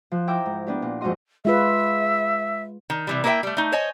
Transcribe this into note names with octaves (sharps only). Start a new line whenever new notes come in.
F3 F#6
E4 G5 A#5 D6 E6
G#2
B3 D4 G4
A#2
F2 G#2 D#4 F#4 D#5 C6
G#3 F4 B4 E5
D#3
C3 E3 G3
A#3 E4 G#4 B4 E5 G5
G3 A3
A3 D#4
C5 C#5 D#5 G#5